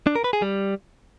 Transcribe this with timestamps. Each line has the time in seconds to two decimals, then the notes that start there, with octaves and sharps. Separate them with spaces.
0.07 D4
0.16 A#4
0.24 B4
0.33 G#4
0.42 G3